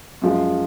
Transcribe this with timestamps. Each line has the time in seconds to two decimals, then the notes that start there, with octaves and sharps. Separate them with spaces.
0.22 F#2 F3 G#3